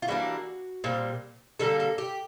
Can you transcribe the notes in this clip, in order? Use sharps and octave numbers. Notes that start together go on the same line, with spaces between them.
F4
E3 G3 A#3 D4 F#4
A#2 G3 C4
D3 G3 A#3 A4
A4
G4